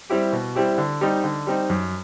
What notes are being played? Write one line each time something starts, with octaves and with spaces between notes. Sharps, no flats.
G3 C4 E4 G4
B2
G3 C4 E4 G4
D3
G3 C4 D#4
D3
G3 C4 D#4
F#2